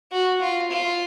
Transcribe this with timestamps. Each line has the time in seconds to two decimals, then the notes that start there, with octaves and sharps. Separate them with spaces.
0.12 F#4
0.40 F4
0.70 F4